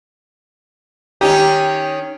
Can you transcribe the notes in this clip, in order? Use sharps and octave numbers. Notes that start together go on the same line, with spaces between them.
D#3 C#4 D#4 G4